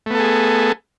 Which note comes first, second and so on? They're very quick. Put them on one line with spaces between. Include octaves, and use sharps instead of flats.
A3 B3 A4 G#4